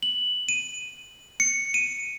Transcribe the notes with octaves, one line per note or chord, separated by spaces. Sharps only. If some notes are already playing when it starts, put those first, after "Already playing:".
F#7
D#7
C#7
D#7